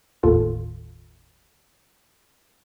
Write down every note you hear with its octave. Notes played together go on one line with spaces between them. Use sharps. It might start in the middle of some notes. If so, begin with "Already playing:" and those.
G1 D#2 A2 F4 A4